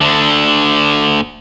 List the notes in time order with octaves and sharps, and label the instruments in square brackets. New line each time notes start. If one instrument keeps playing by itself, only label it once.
[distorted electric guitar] D2 D3